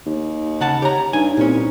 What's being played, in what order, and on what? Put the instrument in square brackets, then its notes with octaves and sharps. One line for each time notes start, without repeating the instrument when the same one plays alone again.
[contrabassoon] D#2
[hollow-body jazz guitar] C#3 F#5 A5
[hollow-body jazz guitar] G4 A#5 [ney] C#5
[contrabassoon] G2 [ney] D#4 [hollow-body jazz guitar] G#5
[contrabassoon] C2 [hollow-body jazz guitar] A#2 C#4 [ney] D#4